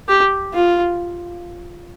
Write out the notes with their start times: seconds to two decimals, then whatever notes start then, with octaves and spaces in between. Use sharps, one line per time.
0.08 G4
0.53 F4